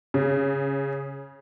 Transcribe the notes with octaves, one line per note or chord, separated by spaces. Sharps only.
C#3